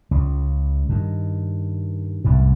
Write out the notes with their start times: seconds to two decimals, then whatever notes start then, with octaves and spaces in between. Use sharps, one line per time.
0.11 C#2 C#3
0.89 G2 D#3
2.24 C2 F#2 A2